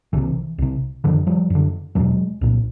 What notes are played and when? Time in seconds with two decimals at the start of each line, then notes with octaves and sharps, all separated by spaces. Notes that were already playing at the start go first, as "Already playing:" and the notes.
0.13 C2 D3 E3
0.17 C3
0.58 C2 C3
1.04 F#2 D3 D#3 F3
1.27 F3 G3
1.50 F#2 D3
1.95 E2 B2 F#3 G#3
2.41 C2 A#2